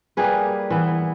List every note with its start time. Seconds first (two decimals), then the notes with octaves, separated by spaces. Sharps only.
0.17 G3 A#3 G#4 B4
0.70 E3 B3